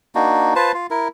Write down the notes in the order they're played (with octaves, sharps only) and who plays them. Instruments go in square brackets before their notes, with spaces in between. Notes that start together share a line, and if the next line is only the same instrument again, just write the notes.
[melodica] A#3 D4 D#4 F#4
F4 B4 C5 A5
F4
E4 A#4